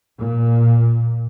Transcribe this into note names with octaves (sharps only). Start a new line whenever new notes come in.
A#2